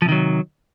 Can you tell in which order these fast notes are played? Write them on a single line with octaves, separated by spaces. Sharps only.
F3 C3 D#3 F#3